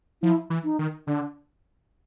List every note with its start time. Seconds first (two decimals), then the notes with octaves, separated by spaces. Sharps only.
0.22 F3 E4
0.50 E3
0.64 D#4
0.79 D#3
1.07 D3 D4